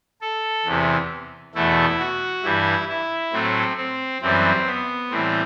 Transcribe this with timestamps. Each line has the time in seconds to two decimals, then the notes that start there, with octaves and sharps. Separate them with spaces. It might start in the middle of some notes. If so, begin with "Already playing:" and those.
0.21 A4
0.65 E2 C3 E3
1.55 E2 B2 A3 E4
1.99 F#4
2.44 G2 E3 G3 E4
2.88 E4
3.32 A2 F#3 A3 C4
3.76 C4
4.21 F#2 E3 G3 C4
4.66 B3
5.10 A2 E3 G3 C4